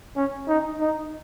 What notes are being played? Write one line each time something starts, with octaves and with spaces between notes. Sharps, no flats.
C#4
D#4
D#4